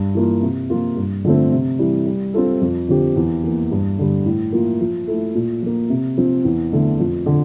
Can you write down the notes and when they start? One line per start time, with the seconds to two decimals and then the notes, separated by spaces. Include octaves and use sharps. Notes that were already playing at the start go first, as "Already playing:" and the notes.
Already playing: G2
0.15 E3 A#3 F4
0.42 C3
0.70 F3 A#3 F4
0.97 G2
1.24 D3 F3 A3 C4
1.52 C3
1.79 E3 G3
2.06 G3
2.34 C4 F4 A4
2.61 F2
2.88 D3 F3 C4 G4
3.16 E2
3.44 E3 A#3
3.71 G2
3.99 D3 G3
4.26 A2
4.52 F3 A#3 F4
4.81 F3
5.07 A3 E4 A4
5.35 A#2
5.62 F3 A#3
5.90 C3
6.17 F3 C4
6.45 E2
6.73 D3 A3
7.00 F2
7.26 D3